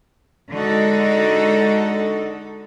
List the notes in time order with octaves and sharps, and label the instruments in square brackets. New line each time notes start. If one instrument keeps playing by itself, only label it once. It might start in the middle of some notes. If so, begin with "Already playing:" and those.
[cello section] D3 G#3 D#4 F#4 A4